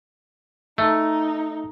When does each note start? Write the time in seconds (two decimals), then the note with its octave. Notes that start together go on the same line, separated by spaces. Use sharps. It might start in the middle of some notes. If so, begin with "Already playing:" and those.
0.78 A3 D#4